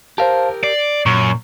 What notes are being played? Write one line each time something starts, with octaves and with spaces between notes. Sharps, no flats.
G4 A#4 C5 F5 A5
D5 C7
F#2 A#2 C#6